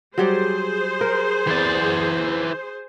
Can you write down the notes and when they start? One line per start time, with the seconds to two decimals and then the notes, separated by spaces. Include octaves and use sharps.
0.18 F#3 G3 G#4 C5 D5
1.01 A#4
1.47 E3 D5